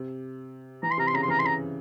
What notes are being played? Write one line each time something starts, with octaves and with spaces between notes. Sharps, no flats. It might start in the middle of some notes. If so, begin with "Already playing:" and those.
Already playing: C3
E3 A#5
C6
C3 A#5
C6
C#3 A#5
C6
E3 A#5
C6
C#3 A#5